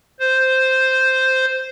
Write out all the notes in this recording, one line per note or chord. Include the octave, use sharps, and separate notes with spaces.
C5